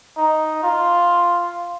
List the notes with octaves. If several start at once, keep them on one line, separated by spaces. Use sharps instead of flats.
D#4
F4